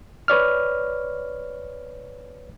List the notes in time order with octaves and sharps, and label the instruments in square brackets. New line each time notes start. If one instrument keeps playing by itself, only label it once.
[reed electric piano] B4 C#5 D5 F6